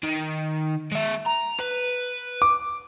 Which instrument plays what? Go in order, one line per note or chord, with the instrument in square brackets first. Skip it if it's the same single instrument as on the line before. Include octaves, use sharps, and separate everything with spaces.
[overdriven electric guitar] D#3
G#3 E5
A#5
B4
[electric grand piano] D6